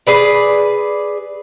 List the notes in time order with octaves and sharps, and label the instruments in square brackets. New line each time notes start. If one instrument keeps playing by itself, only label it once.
[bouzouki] G#4 B4 D5